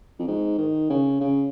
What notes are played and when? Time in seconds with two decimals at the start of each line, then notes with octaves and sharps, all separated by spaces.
0.19 F2
0.27 G#2
0.58 D#3
0.90 C#3
1.20 C#3